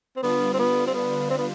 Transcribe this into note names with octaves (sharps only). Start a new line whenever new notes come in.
C4
D3 G3 B3 D4 F4
C4
B3
C4
B3
C4
B3